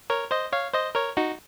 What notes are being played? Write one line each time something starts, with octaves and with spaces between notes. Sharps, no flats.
A#4 C#5
C5 D#5
C#5 F5
C5 D#5
A#4 C#5
D#4 F#4